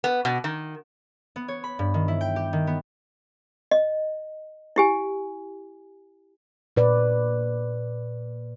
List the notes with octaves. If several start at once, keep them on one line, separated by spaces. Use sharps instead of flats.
B3
B2
D#3
B3
C#5
B5
G2
D#3
E4
G5
G4
D#3
B3
D#5
E4 G4 G#5
A#2 B4 D5